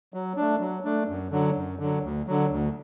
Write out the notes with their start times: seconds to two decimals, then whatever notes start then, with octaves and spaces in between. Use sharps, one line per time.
0.14 F#3
0.36 A3 D4
0.60 F#3
0.85 A3 D4
1.08 F#2
1.31 D3 F#3
1.56 F#2
1.79 D3 F#3
2.03 D2
2.27 D3 F#3
2.50 D2